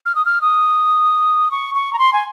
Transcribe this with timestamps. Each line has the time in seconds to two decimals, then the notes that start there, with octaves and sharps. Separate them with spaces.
0.06 F6
0.15 D#6
0.25 F6
0.41 D#6
1.51 C#6
1.75 C#6
1.93 A#5
1.99 C6
2.13 G#5